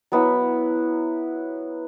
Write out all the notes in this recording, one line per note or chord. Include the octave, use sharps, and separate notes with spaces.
F#3 B3 E4